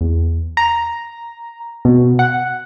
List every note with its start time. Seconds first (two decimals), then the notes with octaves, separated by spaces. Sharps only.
0.01 E2
0.57 A#5
1.85 B2
2.19 F#5